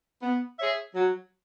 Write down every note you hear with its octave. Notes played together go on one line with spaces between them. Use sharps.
B3
G#4 C#5 E5
F#3